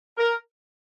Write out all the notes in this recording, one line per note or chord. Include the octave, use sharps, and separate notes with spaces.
A#4